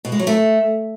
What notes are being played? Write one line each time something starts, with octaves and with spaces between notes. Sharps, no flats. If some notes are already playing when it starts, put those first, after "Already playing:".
B2
G#3
F#3
A3